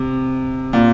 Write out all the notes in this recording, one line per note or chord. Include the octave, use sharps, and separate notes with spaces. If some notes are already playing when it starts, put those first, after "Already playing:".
Already playing: C3
A#2